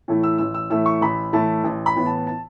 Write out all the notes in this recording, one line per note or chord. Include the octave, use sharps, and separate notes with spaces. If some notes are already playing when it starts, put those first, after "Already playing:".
A2 E3 A3 E4
E6
A1 E6
E6
A2 E3 A3 E4 E6
C#6
A1 B5
A2 E3 A3 E4 A5
A1
B5
A2 E3 B3
A5
A5